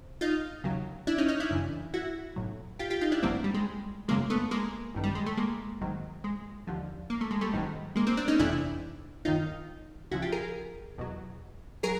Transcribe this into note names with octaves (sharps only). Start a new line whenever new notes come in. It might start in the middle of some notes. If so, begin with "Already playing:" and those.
Already playing: C3
D#4 F4
D#2 C#3 F#3
D4 E4
C#4 D#4
C#4 D#4
D4 E4
F#2 C#3 E3
E4 F#4
B1 A2 F#3
F4 G4
F4 G4
D#4 F4
D4 E4
G#1 G2 D3 F#3 A#3 C4
G3
G#3
F#2 C#3 F#3 G#3 A#3
A3 B3
G#3 A#3
A1 G2 D#3
G3
G#3
A3
G#3 A#3
G#1 G#2 D#3 F#3
G#3
D#2 D3 F3
A#3
A3
G#3
G3 A3
A1 G#2 D#3 F#3
G#3 A#3
A#3 C4
C4 D4
C#4 D#4
G1 F2 C3 E3 D4 E4
G1 F#2 D#3 D#4 F4
C#2 C#3 F3 E4 F#4
F4 G4
G#4 A#4
E2 B2 F#3
F#3 G#4 A#4